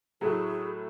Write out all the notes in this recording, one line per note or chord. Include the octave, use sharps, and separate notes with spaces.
A2 F#3 A3 E4 G#4